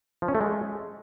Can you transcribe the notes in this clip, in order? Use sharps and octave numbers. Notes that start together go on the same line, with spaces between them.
F3
C#4
A3
G#3